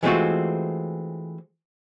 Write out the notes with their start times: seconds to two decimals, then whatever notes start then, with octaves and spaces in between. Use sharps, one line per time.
0.03 E3 G#3 A3 C4 F4 F#4